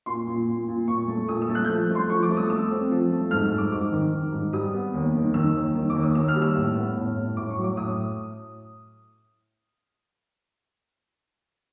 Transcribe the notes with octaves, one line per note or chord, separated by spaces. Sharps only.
A#2 C6
A#2
A#2
A#2
A#2 C#6
A3
A#2 D#6
E6
A3
F#6
G6
F3 F#6
A3
C6
F3 C#6
D6
A3
D#6
A3 E6
C4
F3
A3
G#2 F6
E6
G#2
D6
G#2 D6
D#3
D#3
G#2
G3 D#6
B3
D#2
D#3
D#3 E6
D#2
D#3
D6
D#2
D#6
D#2 E6
F6
G3
E6
A2
B3
A2
A2
A2 D6
C#6
F#3
D6
A2 D#6